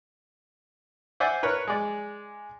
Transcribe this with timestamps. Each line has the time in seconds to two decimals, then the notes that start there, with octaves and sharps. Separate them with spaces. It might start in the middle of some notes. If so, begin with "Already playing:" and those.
1.20 C5 D5 E5 F#5 G#5
1.43 A#4 B4 C#5
1.67 G#3 D5